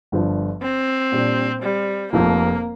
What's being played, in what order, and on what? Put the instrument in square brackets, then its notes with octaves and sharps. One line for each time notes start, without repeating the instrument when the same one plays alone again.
[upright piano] G1 G2 F3 D4
[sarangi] C4
[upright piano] A#2 G3 D4
[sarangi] G3
[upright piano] F1 F2 F3 [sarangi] A#3